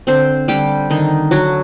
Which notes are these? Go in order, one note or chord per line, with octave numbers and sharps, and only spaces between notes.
D3 C4 C5
D3 G3 G4
D3 D#3 D#4
D3 F#3 F#4